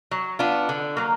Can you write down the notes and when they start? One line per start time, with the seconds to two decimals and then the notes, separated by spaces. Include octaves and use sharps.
0.11 F#3
0.39 B3 D4 F4
0.69 D3
0.97 F#3 A#3